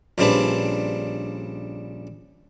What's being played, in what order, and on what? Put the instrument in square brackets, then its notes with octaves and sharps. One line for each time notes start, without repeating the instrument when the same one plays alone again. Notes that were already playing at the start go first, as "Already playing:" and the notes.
[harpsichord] A#1 C#3 G3 C4 D4 B4